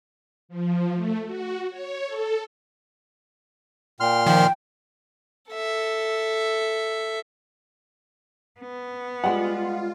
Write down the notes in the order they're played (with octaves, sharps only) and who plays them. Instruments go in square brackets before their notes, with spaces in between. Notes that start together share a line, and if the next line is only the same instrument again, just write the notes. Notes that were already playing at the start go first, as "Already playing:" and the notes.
[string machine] F3
A3
F#4
C#5
A4
[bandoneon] A#2 C6 F6 [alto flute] G5
[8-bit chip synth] D#3 F3 [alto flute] G5
[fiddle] A4 E5
[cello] B3
[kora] G3 G#3 [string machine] F4 [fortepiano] F#5